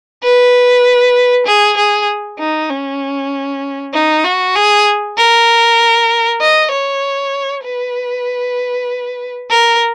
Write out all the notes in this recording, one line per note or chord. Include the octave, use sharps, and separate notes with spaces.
B4
G#4
G#4
D#4
C#4
D#4
F#4
G#4
A#4
D#5
C#5
B4
A#4